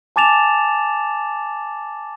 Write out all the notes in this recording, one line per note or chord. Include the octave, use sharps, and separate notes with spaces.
G#5 A5 D6 A6 E7 F7